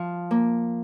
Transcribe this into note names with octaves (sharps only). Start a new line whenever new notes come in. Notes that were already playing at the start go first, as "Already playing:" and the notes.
Already playing: F3
A#3